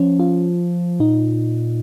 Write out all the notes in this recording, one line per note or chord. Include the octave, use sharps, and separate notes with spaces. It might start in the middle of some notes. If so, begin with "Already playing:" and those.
Already playing: F3 C#4
F4
A#2 D#4